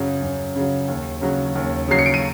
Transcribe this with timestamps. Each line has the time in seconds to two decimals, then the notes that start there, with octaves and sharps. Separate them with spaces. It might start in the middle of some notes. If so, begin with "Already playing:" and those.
Already playing: F#2 C#3 F#3
0.22 F#2
0.56 C#3 F#3
0.88 D#2
1.21 C#3 F#3
1.55 D#2
1.88 C#3 F#3 C7
1.99 C#7
2.06 D7
2.14 D#7